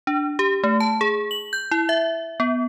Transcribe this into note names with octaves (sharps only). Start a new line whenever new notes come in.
D4
G4
A3
A5
G#4
F#7
G6
E4
E5
B3